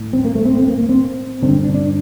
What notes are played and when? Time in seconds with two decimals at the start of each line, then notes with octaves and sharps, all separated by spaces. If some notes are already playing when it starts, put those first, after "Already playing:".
Already playing: A2
0.13 C4
0.24 A#3
0.35 A3
0.45 C4
0.57 C4
0.67 A#3
0.78 A#3
0.89 C4
1.43 G2 D3 C4
1.53 C4
1.64 D4
1.74 D4